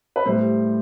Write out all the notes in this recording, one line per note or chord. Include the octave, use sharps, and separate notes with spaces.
B4
A2 G3 C5